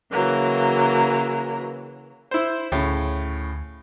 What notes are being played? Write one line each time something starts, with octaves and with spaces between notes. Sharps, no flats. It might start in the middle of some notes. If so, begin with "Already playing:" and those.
C#3 E3 F#3 A#3
E4 C5
D2 A2 C#3